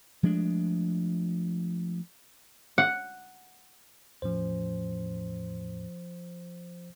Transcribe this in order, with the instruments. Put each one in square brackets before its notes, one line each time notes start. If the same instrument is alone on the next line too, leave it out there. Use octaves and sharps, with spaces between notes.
[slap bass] F3 G#3 A3 D4
[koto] F#5
[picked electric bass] E2 A2 C#4 [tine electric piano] F3 C5